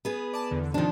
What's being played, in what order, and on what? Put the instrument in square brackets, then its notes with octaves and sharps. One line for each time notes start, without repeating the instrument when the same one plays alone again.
[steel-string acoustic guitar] B3 G#4 B4
[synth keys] D5 A5
E2 D3
[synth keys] C3 D#3 [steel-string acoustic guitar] F3 D4